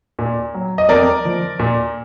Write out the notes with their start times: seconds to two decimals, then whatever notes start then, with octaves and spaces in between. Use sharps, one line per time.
0.19 A#2
0.54 F#3
0.78 D#5
0.89 F2 A#4 D5
1.25 F3
1.59 A#2